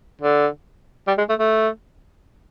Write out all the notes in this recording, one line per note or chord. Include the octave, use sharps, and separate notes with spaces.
D3
G3
G#3
A3
A3